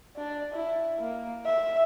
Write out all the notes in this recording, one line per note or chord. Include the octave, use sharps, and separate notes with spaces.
D4
E4
A#3
E5